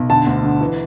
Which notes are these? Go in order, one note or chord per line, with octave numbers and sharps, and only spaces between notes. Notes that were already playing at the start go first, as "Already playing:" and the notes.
Already playing: B1
D3 A5
D2
D3
E3